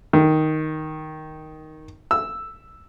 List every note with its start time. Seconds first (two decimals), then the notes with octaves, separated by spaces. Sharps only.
0.13 D#3
2.11 E6